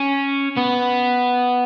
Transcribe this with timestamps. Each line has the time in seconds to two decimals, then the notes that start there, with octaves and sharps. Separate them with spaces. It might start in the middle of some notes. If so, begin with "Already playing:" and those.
Already playing: C#4
0.57 B3